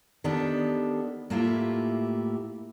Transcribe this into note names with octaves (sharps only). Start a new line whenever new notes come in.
D#3 B3 D4 G4 A4
A2 A#3 E4 F4 G4